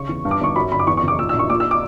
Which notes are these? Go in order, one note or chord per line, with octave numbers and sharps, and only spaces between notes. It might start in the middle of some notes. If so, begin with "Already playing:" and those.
Already playing: C#3 C#6
E2
G2
D6
G1 C#6
F#2 B5
G1 B5
D6
E2 C#6
C#6
F#1
D6
A#2 E6
E6
A#1 C#6
A#2 D6
E6
D6